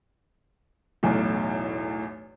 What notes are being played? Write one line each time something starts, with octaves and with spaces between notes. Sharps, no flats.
B1 E2 A2